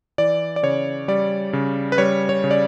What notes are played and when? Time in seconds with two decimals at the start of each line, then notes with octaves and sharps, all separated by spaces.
0.18 E3 D5
0.56 D5
0.63 C#3 C#5
1.08 G3 D5
1.53 C#3
1.92 B4
1.98 G3 C#5
2.29 C#5
2.44 C#3
2.51 D5